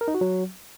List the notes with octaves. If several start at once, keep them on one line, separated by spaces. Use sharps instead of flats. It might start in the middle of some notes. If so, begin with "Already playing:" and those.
A#4
D#4
F#4
F#3